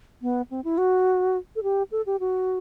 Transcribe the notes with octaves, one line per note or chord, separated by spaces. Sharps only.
B3
C4
E4
F#4
A4
G4
A4
G4
F#4